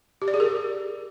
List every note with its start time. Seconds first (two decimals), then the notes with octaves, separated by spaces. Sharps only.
0.22 G4
0.28 D5
0.34 G#4
0.40 A#4